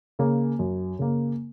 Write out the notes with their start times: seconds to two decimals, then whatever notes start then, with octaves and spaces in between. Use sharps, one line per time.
0.19 C#3 A#3
0.59 F#2
0.99 C#3 A#3